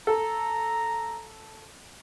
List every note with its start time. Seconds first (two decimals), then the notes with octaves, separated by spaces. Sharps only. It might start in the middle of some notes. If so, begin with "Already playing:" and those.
0.07 A4 A#5